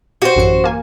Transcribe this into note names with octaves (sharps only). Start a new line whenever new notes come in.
F#4 G4 C5
A1 F#2 C#7
A#3 G#5